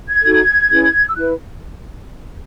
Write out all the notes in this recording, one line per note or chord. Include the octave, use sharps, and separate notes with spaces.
G#6
D#4 F#4 A4
C#4 E4 G#4 B4
E6
E4 B4 F#6